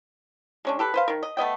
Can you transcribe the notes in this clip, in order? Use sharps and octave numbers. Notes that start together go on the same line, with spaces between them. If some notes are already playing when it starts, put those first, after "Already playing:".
G#3 C#4 D4
G4 A4 B4
B4 C5 F5
D#3 A#4
D#5
A3 B3 D#5 G5